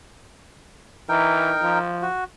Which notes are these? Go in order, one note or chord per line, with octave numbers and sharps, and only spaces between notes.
E3 D#4 A#4 G5
F3
F#4